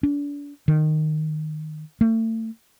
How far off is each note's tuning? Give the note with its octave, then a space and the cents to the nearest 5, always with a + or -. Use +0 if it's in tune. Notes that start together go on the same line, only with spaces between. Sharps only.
D4 -35
D#3 -10
A3 +35